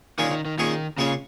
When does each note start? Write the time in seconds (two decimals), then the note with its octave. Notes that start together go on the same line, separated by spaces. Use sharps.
0.18 A#2 D#3 G#3 C#4 G#4
0.31 D#3
0.45 D#3
0.58 A#2 D#3 G#3 C#4 G#4
0.98 A#2 C#3 G#3 C#4 G#4